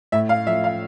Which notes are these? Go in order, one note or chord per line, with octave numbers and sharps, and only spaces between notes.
A2 E5
F5
F3 A3 E5
F5